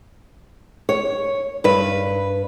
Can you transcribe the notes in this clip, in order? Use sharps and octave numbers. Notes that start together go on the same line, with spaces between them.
C#5
G2 B4